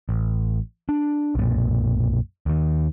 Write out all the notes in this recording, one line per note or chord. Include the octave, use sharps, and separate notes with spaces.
A1
D4
B1 F#2 A#2
D#2 D#3